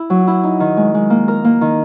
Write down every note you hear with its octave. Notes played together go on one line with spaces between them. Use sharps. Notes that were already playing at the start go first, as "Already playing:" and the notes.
Already playing: E4
F#3
E4
D#4
D#3
G#3
G#3
A#3
A#4
A#3
D#3